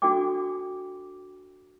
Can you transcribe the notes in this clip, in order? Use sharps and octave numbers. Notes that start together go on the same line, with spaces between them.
D4 F#4 A4 G5 G#5 D6